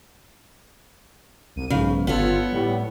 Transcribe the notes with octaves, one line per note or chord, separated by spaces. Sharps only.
C2 D#7
B1 G#2 C#3
G1 B3 F4 A4 C#5
A2 G3